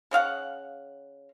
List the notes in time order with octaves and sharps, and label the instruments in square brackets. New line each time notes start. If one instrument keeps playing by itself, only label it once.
[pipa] C#3 D#5 F5 F#5